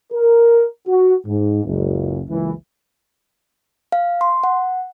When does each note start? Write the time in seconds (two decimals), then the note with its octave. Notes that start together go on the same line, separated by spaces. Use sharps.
0.12 A#4
0.88 F#4
1.26 G#2
1.65 F#1 C#2
2.28 F#1 C#2 E3
3.92 F5
4.21 C6
4.44 F#5